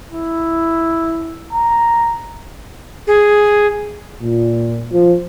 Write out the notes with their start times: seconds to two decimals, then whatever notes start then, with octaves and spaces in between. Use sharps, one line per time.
0.11 E4
1.53 A#5
3.07 G#4
4.22 A#2
4.91 F3